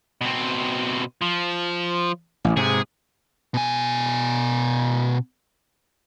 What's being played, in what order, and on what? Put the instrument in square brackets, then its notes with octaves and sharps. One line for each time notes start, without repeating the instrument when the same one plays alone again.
[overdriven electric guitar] B2 C4
F3
[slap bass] A1
[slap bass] G#2 C3 [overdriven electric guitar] G#4
[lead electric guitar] B2 G#5